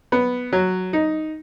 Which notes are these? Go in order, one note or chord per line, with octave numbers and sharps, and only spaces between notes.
B3
F#3
D#4